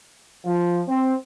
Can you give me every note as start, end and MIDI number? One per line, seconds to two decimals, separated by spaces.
0.45 0.81 53
0.87 1.12 60